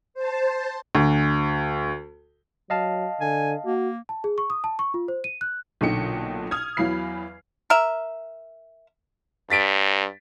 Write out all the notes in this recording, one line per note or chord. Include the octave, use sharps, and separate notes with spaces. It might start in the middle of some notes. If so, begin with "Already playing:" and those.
C5 A5
D2
F#3 D#5 F5 A5
D3 G#5
A#3 F#4
A5
G#4
C#6
D#6
A5
C#6
F4
C5
D#7
F#6
B1 A#2 D3 D#4 G5 C#7
D#6 F6 G#6
E2 E3 F#3 F5 B5 C7
A#4 E5
G2 A6 B6 D7